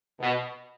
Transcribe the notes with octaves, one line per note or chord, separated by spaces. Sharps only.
B2